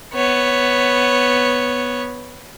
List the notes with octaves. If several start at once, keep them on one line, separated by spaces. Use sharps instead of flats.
B3 C#5